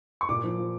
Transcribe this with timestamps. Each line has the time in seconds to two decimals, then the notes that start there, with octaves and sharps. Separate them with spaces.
0.21 C#6
0.29 A#2 D6
0.43 F3
0.58 F3